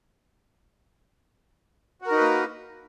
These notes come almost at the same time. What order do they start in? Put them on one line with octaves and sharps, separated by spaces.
F#4 A#4 D#4 B4 A#3